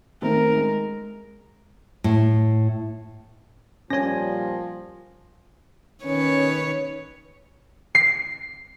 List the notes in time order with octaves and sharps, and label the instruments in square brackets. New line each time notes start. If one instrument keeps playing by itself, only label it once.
[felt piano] D#3 A3 C4 [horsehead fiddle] A#4
[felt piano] G#3
[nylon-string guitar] A2
[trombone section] A#2 G3 [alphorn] F3 [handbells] C#4 C#5 [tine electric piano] G#5 A#6
[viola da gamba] D#3 B4 C#5 [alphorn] C#4
[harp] C7